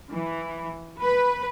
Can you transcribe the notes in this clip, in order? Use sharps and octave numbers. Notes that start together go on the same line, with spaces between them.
E3
B4